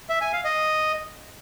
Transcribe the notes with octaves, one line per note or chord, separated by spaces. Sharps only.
E5
G#5
F5
D#5